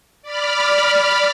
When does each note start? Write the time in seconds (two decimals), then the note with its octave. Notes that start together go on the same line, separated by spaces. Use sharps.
0.22 D5 B5 F6